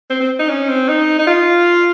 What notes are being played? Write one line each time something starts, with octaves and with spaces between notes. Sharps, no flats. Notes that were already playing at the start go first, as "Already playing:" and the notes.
C4
C4
D#4
C#4
C4
D#4
D#4
F4